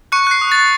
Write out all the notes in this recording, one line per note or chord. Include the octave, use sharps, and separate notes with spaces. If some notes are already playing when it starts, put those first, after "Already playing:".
C#6 F#6 C#7
F#6 C7
D#6
D#6 A6